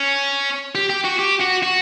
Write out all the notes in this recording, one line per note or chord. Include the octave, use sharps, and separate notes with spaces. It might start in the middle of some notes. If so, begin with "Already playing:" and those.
Already playing: C#4
G4
G4
F#4
G4
F#4
F#4